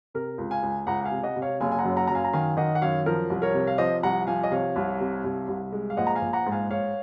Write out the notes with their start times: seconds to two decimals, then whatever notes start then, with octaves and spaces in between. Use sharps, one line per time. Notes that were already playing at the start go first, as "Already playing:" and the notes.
0.14 C3 A#4
0.38 C#2
0.51 F5 G#5
0.63 C#2
0.87 C#2 F#5 A#5
1.01 F#5
1.05 F5 G#5
1.11 C3
1.23 D#5 F#5
1.36 C3
1.42 C#5 F5
1.60 F#1 F5 G#5
1.72 G#5
1.79 F#5 A#5
1.85 F#2
1.96 F#5 A#5
2.07 F#2 A#5
2.15 F5 G#5
2.24 A#5
2.33 D#3 F5 G#5
2.57 D#3 D#5 F#5
2.75 F#5
2.82 F#2 C#5 F5
3.06 F3 A#4
3.30 C2
3.42 A#4 C#5
3.54 C3
3.67 F5
3.78 F3 C5 D#5
4.03 C2 F#5 A#5
4.27 F3 F5 G#5
4.43 D#5
4.51 C3 C#5 F5
4.76 C2
5.01 C3
5.24 C2
5.48 C2
5.72 G#3
5.90 F5
5.97 A#1 D#5 F#5
6.07 A#5
6.15 F5 G#5
6.22 A#1
6.33 F#5 A#5
6.46 G#2
6.51 F5 G#5
6.70 G#2 C#5 F5